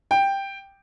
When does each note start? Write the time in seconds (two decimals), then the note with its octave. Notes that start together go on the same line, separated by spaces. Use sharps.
0.11 G5